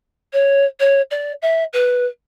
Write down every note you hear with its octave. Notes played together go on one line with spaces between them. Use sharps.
C#5
C#5
D5
E5
B4